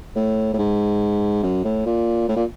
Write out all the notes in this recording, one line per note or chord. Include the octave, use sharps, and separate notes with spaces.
A2
A2
G#2
F#2
A2
A#2
A2
A#2